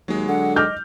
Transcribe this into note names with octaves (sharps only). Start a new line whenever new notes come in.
D#2 F#3 G#3
D3 F#5
D#5 D6 F6 G6